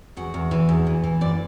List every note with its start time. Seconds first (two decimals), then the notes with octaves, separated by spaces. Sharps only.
0.17 E2 F#4
0.34 E2
0.51 E3
0.69 E2
0.87 E3
1.04 E3
1.21 F#2 D5